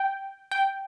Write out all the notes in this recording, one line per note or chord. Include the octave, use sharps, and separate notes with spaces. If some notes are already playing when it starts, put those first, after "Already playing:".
Already playing: G5
G5